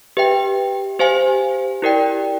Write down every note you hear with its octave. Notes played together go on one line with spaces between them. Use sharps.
G4 B4 E5 G5
G4 C5 F5 G#5
E4 G4 A#4 D5 G5